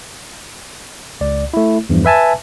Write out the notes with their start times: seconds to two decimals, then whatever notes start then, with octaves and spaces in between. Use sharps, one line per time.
1.21 C#2 D5
1.54 A3 E4
1.89 E2 G2 E3 F3
2.05 B4 E5 G#5 A5